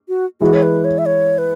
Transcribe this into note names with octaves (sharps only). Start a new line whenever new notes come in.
F#4
E3 G#3 E4 F#4 G#4
C#5
B4
C#5
E5
C#5
B4